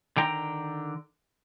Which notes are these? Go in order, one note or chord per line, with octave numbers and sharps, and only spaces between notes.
D3 D#3 G5 A#5